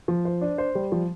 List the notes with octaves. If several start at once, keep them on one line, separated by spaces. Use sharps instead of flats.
F3
C5
D4
C5
G3
F3